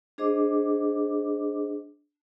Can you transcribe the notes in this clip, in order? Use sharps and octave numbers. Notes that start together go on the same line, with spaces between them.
D4 G#4 C5 D#5 D6